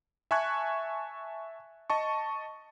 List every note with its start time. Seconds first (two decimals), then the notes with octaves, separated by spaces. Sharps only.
0.31 E5 G#5 A5 C#6 F#6 G#6
1.90 D#5 A5 C#6